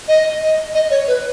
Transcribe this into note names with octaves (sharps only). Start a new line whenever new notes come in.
D#5
D#5
D#5
C#5
B4